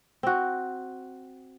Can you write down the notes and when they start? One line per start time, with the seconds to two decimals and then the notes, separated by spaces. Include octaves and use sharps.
0.23 C4 F#4